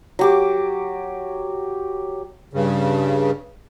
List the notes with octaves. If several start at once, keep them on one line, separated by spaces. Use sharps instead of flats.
F#3 G4 D6
G2 C#3